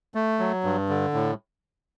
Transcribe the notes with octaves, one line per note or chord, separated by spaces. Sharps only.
A3
F#3
G2
D3
A2